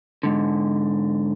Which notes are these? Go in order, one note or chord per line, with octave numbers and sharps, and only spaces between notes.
G#2 D3